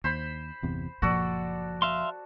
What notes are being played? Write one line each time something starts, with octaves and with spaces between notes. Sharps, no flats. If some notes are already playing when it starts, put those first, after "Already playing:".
D#2 C5 B5
G1 E2 C3
F#1 A#2 F3 A#3 F#4 A4 D5
E5 F5 C6